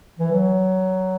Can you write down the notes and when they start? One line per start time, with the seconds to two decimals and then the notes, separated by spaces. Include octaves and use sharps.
0.19 E3
0.31 F#3